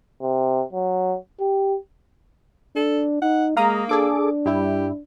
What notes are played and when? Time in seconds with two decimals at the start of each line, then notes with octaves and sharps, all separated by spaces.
0.21 C3
0.73 F#3
1.40 G4
2.76 D4 A4
3.22 D#4 F#5
3.57 G#3 A#3 F5 A#5 D#6
3.89 D4 G#4 A4 D6
4.46 G2 E4 G4